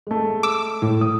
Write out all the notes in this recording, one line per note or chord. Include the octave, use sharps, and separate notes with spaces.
G#3 A3
D6 E6
A2
D#6